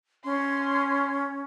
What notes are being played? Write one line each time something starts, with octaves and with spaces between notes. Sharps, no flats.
C#4 C6